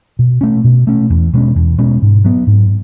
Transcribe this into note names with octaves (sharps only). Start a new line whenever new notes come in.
B2
A3 C#4
B2
A3 C#4
E2
B2 G#3 C#4
E2
B2 G#3 C#4
G#2
F#3 B3
G#2